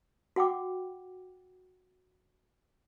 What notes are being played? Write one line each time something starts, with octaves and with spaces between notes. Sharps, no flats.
F#4 F#5 G5 D6